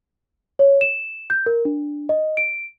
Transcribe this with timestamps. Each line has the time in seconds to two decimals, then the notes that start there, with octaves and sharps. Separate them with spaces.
0.59 C#5
0.81 E7
1.30 G6
1.46 A#4
1.65 D4
2.09 D#5
2.37 D7